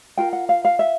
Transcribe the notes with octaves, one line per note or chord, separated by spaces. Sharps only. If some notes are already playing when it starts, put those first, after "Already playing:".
F4 A#4 G5
F#5
F5
F5
E5